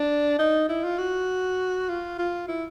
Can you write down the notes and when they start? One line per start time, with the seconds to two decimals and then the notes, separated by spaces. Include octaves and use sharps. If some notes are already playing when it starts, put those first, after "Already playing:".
Already playing: D4
0.39 D#4
0.69 E4
0.84 F4
0.98 F#4
1.89 F4
2.19 F4
2.48 E4